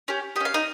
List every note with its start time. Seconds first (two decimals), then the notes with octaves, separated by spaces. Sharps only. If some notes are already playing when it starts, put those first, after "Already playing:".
0.08 C#4 G4
0.36 G4 D#5
0.40 C#4 F5
0.54 D#4 D#5